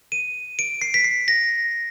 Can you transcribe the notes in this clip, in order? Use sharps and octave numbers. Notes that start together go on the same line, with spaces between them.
D#7
D7
C7
B6
C7
A#6